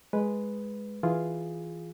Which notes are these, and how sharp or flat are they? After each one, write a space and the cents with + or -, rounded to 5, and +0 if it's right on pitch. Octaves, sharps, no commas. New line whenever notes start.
G#3 +0 B4 +0
E3 +0 F4 +0 G#4 +0